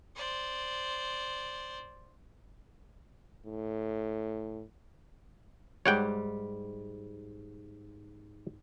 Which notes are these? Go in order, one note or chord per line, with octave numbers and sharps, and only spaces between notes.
C5 D5
A2
G#2 G3 C#5 F#5 G5